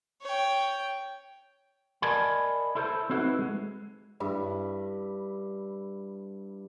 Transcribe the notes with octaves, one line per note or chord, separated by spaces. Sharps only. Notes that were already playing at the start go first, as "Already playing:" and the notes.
C#5 G5
A#4 D5 D#5 G#5 A5 B5
E4 A4 C5
C4 D#4 E4 F#4 A4 B4
G#3
G2 E4